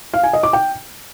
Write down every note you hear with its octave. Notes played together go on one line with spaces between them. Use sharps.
F5
G#5
D#5
D6
G5